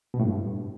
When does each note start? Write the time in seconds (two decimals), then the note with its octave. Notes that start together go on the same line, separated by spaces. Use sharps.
0.14 B2
0.20 A2
0.25 G2